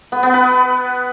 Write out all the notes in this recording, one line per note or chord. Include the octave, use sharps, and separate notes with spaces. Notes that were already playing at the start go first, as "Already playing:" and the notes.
B3
B3
B4